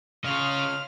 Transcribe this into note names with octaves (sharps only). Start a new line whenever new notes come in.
C#3 C#4 D#5 F5 C6 F6